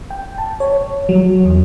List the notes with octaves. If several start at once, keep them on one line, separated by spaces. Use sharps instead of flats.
G5
A5
C#5
F#3
E2